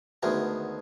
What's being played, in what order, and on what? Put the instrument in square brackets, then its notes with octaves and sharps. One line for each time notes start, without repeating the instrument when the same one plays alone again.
[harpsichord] D2 D#3 G#3 A3 B3